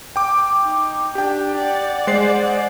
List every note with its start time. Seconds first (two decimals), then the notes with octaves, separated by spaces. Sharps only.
0.16 G5 D6
0.64 D#4
1.15 D4 G4 G5
1.57 D5 F#5
2.07 G#3 C5 C7